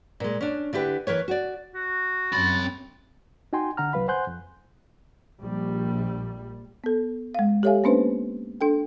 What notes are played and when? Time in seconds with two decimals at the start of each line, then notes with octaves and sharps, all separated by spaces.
0.20 A#2 G#3
0.41 C#4 D4
0.73 D3 E4 G4 B4
1.07 E3 A#4 B4 C#5
1.28 F#4 D5
1.74 F#4
2.33 F#2 C4 B5 A6
3.53 D#4 F#4 G5 G#5 C6
3.77 D3 F#5 A#5 F6
3.93 C2 F#3 B4 F5 B5
4.08 C5 F#5 G#5 C6 F#6 G6
4.27 F2
5.40 A#1 G3
6.84 B3 A4
7.35 G#3 F5
7.63 G4 A4 C#5 E5 F5 G#5
7.84 A#3 B3 C#4 D4 B4 C5
8.61 D4 A4 G5